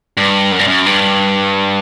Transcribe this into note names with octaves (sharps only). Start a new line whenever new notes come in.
G2
F#2
G2
F#2
G2